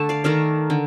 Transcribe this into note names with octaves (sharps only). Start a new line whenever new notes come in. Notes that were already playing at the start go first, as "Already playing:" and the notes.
Already playing: D3 A3 A5
D5 F5
D#3 A3 A#4 D5
D3